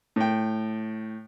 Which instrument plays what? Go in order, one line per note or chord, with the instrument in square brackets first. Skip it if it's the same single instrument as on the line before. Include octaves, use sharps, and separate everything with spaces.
[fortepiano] A2 G5